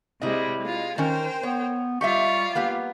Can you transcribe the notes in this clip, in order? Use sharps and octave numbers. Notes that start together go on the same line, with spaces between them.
C3 G3 G#3 E4 D#5
G#3 F4
D#3 C#4 A#4 C5 G5
B3 C#5
G3 F4 G4 D#5 E5 C#6
A#3 B3 G4 F5